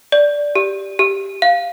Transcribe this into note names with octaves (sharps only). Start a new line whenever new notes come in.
D5
G4
G4
F5